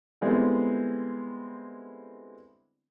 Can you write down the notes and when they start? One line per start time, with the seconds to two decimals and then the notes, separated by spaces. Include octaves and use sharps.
0.21 D3 G3 G#3 B3 C4 E4